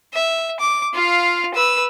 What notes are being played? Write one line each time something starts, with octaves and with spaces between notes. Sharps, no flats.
E5
D6
F4 F5
B4 E6